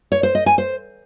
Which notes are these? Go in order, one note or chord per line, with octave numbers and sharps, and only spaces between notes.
C#5
C5
D#5
G#5
C5